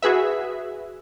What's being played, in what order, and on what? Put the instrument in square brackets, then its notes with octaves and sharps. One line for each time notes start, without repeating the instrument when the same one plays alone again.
[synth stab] F#4 G#4 B4 E5